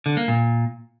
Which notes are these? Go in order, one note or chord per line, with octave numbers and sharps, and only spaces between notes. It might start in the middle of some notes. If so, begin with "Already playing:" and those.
D3
A#3
A#2